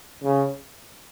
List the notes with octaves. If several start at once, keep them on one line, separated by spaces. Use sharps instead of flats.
C#3